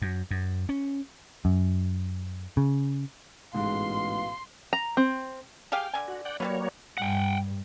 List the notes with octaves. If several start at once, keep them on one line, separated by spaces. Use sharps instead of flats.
F#2
F#2
C#4
F#2
C#3
A1 G#2 B2 G#3 F5 C6
A#5
C4
G4 G#4 F5 G5 F6
D3 G#5
F#4
D5 F#5 G5
F#3 G3 A#3 F4 B4 C#5
G2 G3 F#5 G5